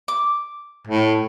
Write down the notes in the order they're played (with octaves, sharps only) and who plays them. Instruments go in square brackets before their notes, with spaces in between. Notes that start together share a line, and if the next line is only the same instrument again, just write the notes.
[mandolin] D6
[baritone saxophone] A2